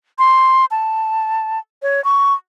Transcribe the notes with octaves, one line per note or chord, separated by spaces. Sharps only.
C6
A5
C#5
C#6